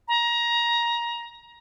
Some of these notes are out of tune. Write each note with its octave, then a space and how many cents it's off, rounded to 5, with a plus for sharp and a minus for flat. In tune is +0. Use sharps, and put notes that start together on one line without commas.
A#5 +20